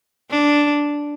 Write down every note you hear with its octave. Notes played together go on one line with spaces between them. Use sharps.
D4